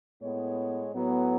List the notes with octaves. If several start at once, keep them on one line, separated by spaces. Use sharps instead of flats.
A2 G#3 B3 C#5
A2 F#3 B3